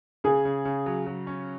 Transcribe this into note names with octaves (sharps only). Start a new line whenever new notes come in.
C#3 G#4
C#3
C#3
F#3
F#3
C#4